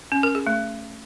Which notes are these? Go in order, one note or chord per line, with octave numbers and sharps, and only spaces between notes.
C#4
A#4
G#4
A3